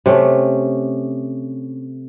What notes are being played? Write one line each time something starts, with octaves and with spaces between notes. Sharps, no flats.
C3 A3 C#4